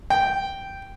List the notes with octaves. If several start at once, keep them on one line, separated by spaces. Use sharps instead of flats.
G5